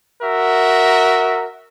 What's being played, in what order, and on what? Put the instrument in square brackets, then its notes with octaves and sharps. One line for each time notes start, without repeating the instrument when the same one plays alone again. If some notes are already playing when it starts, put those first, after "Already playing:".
[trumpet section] F#4 A#4 E5